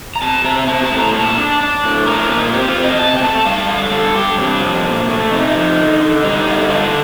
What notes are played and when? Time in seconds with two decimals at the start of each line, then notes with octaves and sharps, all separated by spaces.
0.16 A#5
0.22 C3 A5
0.44 C3 A#5
0.68 C4 A5
0.84 A5
0.91 A2
0.99 A#5
1.14 A#2 A5
1.38 D4
1.61 D4
1.84 A2
2.06 D4 A#4
2.30 A#2
2.38 D#4
2.46 F4
2.53 C4 G4
2.68 F4
2.77 C4
2.84 D#5
2.99 C3 A5
3.16 G5
3.22 A3 A5
3.45 G3 F5
3.68 D3 F5
3.92 G2 A4
4.15 G2 G4
4.38 C3 D4
4.61 F3
4.84 A#2
5.08 A3
5.31 C3 D#4
5.54 F3
5.77 D3
6.00 D3
6.23 G3 D#4
6.46 D3
6.70 D4 F4